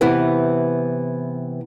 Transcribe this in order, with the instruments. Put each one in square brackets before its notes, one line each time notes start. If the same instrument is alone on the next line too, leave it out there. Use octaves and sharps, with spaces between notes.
[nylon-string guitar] C3 E3 B3 E4 G4 B4